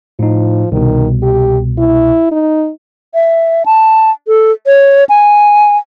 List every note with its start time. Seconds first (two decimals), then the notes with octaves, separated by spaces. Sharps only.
0.19 A2 F3 D#4
0.72 C2 B2 D#3
1.23 G4
1.78 E4
2.32 D#4
3.14 E5
3.66 A5
4.28 A4
4.67 C#5
5.09 G#5